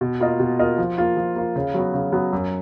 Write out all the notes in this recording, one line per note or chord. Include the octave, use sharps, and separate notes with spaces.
B2
A#3 F4 A#4 D#5
B2
A#3 F4 A#4 D#5
F3
A#3 F4
F3
A#3 F4
C#3
F#3 B3 F#4
C#3
F#3 B3 F#4
F#2